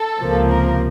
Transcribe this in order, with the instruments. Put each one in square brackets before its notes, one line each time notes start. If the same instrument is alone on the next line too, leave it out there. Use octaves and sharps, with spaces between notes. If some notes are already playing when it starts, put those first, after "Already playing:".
Already playing: [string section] A4
C#2 C3 F3 A#3
A#4